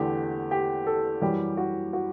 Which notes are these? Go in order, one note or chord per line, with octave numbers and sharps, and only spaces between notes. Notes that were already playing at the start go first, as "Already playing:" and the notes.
Already playing: E2 D3 A3 G4
G4
A4
F#2 E3 G3 G4
F#4
F#4